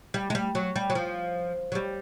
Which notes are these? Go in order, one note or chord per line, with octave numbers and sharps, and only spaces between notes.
G3
G#3
G3
F#3
G3
F#3
F3
F#3
G3